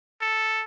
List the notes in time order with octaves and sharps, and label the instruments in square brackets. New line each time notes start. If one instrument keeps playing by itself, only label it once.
[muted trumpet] A4